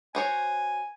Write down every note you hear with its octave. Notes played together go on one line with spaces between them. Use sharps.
F#4 C5 C#5 G#5